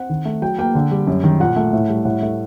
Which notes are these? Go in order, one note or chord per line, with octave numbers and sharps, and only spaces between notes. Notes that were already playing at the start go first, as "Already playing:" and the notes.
Already playing: C4 F#5
D#3
A3
F#3 G5
A#3 G5
D3
G3
F#2
D#3
A#2 F#5
A3
A2
G3
A2 F#5
A3